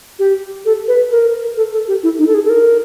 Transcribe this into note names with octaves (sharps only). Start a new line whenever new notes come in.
G4
A4
B4
A#4
A4
A4
G4
E4
D#4
A4
G#4
A4
A#4